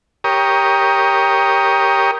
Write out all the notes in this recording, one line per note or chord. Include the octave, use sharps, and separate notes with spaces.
G4 A#4 C#5 D#6